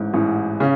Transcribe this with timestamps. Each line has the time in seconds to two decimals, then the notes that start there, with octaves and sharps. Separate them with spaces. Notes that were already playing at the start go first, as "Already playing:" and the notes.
Already playing: A1 G#2 E3
0.13 A1 G#2 E3
0.60 C#3 C#4